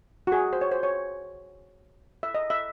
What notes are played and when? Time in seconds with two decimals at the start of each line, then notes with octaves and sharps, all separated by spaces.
0.27 F#4
0.32 G#4
0.53 C5
0.61 C#5
0.72 C5
0.83 C#5
2.23 E5
2.35 D#5
2.50 E5